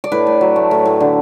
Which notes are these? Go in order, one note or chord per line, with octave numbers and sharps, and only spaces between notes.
D5
A2 B4
A2
F#3
A3
A2
A2
D3